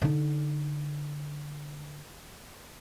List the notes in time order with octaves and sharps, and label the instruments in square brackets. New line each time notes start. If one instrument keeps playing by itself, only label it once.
[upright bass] D3 D#4